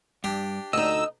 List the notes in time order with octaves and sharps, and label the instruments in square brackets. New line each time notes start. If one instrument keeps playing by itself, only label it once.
[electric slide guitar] G2 [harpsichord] D4 G4
[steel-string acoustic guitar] D2 D#4 [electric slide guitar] D#5 [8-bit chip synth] E6